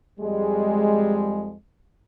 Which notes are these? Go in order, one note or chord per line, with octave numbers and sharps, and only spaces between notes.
F2 G3 G#3